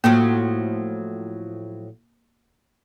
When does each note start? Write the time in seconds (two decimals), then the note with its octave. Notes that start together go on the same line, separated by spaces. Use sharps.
0.04 A2 F3 F#3 A#3